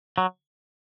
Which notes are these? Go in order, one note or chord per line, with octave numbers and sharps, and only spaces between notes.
F#3